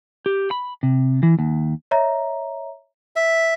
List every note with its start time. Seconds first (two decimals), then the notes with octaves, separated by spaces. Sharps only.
0.26 G4
0.51 B5
0.83 C3
1.23 E3
1.39 D#2
1.91 C#5 D#5 E5 A#5
3.16 E5